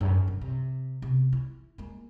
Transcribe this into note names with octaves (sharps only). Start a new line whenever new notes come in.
F#2
D3
C3
C3 B3
E4
G#3 A#3